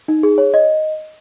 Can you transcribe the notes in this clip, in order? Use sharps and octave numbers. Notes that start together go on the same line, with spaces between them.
D#4
G#4
C#5
D#5